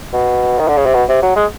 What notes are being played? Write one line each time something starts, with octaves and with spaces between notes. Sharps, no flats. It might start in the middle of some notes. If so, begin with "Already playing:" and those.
B2
D#3
D3
C#3
C3
B2
C3
F#3
G#3